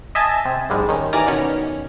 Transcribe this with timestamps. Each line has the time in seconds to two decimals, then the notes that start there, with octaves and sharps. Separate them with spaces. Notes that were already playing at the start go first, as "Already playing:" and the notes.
0.15 D#5 E5 G#5 A5
0.45 C3
0.70 A#1 G#2 G3 G#3
0.89 D#3 C#4
1.13 D#2 E3 D5 G#5 A#5 F6
1.26 B2 D#3 C#4